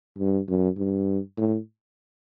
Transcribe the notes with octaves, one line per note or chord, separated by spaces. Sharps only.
G2
F#2
G2
A2